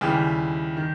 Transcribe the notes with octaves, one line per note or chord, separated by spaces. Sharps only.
D#2 C#3 E3 G3 G4
D#3